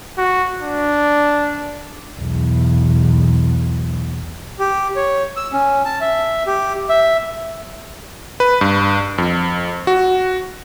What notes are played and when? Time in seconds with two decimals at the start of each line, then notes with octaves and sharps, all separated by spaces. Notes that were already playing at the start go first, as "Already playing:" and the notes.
0.17 F#4
0.62 D4
2.19 B1 E2
4.59 G4
4.96 C#5
5.37 E6
5.53 C#4
5.85 A5
6.01 E5
6.46 G4
6.89 E5
8.40 B4
8.61 G2
9.18 F2
9.87 F#4